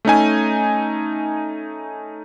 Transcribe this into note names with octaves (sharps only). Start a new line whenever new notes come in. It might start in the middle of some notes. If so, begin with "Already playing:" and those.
A3 C#4 D#4 G#5